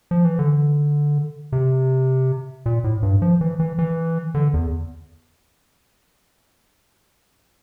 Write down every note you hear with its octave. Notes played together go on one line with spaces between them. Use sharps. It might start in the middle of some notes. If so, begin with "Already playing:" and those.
F3
E3
D3
C3
A#2
A2
G2
F3
E3
E3
E3
D3
E2